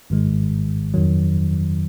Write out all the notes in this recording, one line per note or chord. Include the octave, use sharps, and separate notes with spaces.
G#1 G#2 D#3 G#3
F2 D#3 F#3